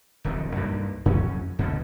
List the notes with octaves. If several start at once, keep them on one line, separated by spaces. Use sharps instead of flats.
D1 B1 F2 D#3
B1 G2 A#3
F2 F#3 C#4
C#2 B2 D3